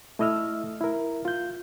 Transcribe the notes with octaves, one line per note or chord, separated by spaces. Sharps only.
A3 E4 D#5 E6 F6
E4 A#4
F4 G6